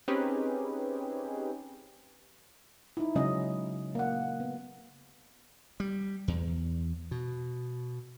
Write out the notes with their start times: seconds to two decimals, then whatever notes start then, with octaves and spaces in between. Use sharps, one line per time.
0.08 C4 C#4 D#4 G4 G#4 B4
2.97 D#4 E4
3.15 C#3 F#3 G#3 C#4 D#5
3.95 A#3 F#5
4.40 B3
5.80 G3
6.28 E2
7.11 B2